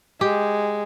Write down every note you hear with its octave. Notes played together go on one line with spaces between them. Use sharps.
G#3 G4